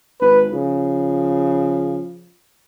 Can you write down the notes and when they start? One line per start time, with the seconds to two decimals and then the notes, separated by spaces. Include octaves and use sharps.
0.21 G#1 B4
0.52 C#3 F3